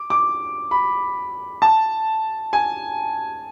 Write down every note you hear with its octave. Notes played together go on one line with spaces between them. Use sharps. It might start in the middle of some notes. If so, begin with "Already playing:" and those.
Already playing: D6
D6
B5
A5
G#5